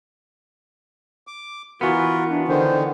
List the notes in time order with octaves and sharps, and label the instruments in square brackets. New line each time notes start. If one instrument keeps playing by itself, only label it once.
[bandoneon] D6
[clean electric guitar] E3 B3 [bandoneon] F4 A#4 [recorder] F#4
[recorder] D4
[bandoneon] D3 D#3 [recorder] C5